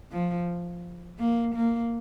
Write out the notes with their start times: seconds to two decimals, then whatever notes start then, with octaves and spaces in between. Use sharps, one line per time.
0.12 F3
1.19 A#3
1.55 A#3